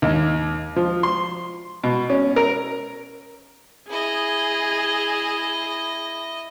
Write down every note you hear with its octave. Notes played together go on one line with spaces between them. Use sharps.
D#2
F3
C6
B2
C#4
A#4
E4 G#4 D#5